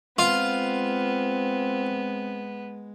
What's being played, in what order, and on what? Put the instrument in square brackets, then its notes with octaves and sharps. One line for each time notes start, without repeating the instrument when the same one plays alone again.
[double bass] G#3 [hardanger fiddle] B3 [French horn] C4 [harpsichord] F4